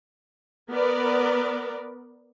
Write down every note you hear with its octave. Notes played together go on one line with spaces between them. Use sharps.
B3 A#4 B4 D5